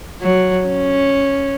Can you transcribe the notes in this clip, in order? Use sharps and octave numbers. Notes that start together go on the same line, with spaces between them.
F#3
C#4